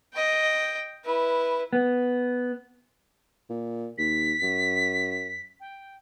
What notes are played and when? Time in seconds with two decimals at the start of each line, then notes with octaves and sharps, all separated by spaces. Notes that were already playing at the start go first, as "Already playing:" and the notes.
0.13 D#5 G5
1.05 E4 B4
1.73 B3
3.50 A#2
3.98 D#2 B6
4.42 F#2
5.60 G5